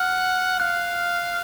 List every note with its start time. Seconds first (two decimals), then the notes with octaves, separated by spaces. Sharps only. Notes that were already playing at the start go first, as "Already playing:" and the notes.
Already playing: F#5 F6
0.59 F5 F#6